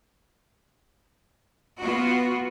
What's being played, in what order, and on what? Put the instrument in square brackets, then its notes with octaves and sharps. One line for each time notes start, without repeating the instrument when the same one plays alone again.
[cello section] B3 F4 F#4